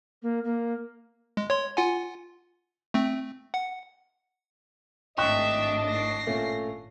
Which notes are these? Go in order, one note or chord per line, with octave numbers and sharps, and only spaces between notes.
A#3
A#3
G#3
C#5 C6
F4 F#5 G#5
A3 C4
F#5
G#1 A2 D4 D#5 E5 G5 C#6 F#6
A#6 C7
A#2 A3 C#4